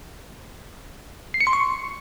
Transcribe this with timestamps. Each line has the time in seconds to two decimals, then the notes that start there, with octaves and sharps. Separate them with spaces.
1.34 C7
1.41 C#7
1.47 C6
1.53 C#6